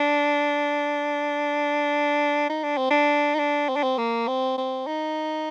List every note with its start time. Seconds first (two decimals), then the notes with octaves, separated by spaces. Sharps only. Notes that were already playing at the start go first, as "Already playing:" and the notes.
Already playing: D4
2.49 D#4
2.63 D4
2.77 C4
2.90 D4
3.34 D#4
3.39 D4
3.69 C4
3.76 D4
3.83 C4
3.98 A#3
4.28 C4
4.58 C4
4.86 D#4